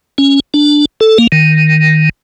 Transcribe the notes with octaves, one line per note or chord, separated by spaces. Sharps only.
C#4
D4
A4
A#3
D#3